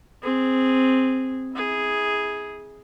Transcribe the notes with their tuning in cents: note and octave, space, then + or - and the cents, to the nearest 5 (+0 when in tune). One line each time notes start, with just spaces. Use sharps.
C4 +0 G#4 -5
E4 -35 G#4 +0